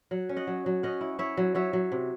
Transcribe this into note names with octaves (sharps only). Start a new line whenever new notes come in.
F#3 F#5
C#4
D#5 F#5
F#3
F#3
C#4 D#5 F#5
E4
E4 C#5 E5
F#3
F#3 C#5 E5
F#3
C3